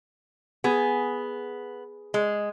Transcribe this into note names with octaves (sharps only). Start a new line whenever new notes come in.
B3 G#4
G#3